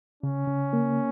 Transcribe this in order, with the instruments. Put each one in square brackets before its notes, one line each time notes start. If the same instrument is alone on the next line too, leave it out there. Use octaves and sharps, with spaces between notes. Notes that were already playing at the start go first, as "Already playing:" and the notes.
[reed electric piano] C#3 [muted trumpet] C#4
[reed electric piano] C#3
A#3